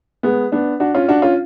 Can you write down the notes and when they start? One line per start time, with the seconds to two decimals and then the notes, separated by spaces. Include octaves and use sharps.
0.23 G#3 B3
0.52 B3 D4
0.80 D4 F#4
0.94 C#4 F4
1.08 D4 F#4
1.22 C#4 F4